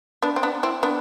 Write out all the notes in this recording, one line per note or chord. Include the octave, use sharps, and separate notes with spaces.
B3 D4
C4
B3 D4
C4 E4
B3 D4